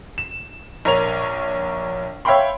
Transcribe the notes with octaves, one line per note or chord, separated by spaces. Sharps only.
E7
A#1 A#4 C#5 F7
C#5 E5 F5 G5 B5 C6